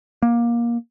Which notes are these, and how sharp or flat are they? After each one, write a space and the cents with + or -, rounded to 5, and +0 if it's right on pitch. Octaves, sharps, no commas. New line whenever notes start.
A#3 +20